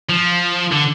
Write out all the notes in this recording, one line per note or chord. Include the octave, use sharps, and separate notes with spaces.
F3
D3